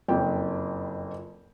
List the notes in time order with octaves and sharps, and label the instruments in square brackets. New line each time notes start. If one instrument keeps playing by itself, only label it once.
[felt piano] F#1 F2 G5